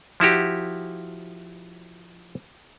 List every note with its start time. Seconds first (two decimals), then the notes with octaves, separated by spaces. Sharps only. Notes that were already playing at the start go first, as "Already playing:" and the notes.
0.20 F3 E4 F#4 G4